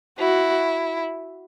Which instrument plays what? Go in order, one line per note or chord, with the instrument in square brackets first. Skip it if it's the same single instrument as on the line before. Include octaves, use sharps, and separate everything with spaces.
[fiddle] E4 [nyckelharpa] F#4